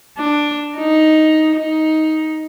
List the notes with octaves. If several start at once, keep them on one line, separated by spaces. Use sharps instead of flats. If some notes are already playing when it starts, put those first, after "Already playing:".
D4
D#4
D#4